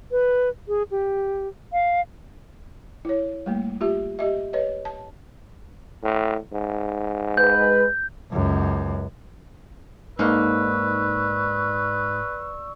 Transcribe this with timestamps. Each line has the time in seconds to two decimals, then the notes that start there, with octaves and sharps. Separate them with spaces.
0.11 B4
0.68 G#4
0.91 G4
1.73 F5
3.05 E4 C#5
3.46 G3 A3 A#3
3.81 F4 G4 E5
4.19 G4 D#5 E5
4.53 B4 C#5 D#5
4.85 A5
6.03 A2
6.53 G#2
7.37 G#3 B4 G6
8.32 C#2 F#2
10.19 G#2 A#3 D#4 B4 D5 C#6 E6